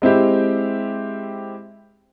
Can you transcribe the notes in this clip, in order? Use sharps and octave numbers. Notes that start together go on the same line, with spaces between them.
G#3 C4 E4 G4